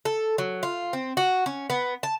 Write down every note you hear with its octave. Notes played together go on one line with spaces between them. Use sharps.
A4
F#3
F4
C4
F#4
C#4
B3
A5